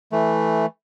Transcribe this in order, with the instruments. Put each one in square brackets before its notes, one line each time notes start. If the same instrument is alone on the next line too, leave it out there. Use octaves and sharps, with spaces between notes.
[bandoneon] E3 A3